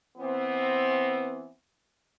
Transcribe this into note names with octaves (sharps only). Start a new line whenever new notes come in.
E3 B3 C4